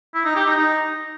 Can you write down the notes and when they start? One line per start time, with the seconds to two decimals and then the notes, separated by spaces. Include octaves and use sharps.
0.14 E4
0.25 D#4
0.36 G4
0.46 D#4
0.57 D#4